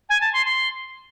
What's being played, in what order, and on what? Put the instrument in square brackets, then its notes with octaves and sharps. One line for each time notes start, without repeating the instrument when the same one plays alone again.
[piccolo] G#5
A5
C6
C6